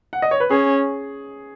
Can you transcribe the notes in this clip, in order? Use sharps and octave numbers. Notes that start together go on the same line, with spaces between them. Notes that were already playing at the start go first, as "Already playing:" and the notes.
F#5
D#5
C#5
B4
C#4 G#4